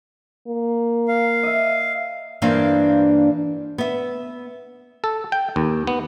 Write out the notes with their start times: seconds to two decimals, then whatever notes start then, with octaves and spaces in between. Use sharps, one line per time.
0.48 A#3
1.08 F5
1.43 D#5 E5
2.42 G2 E3 A#3 D4 C5 F5
3.78 B3 E5
5.04 A4
5.32 G5
5.56 D#2
5.87 B3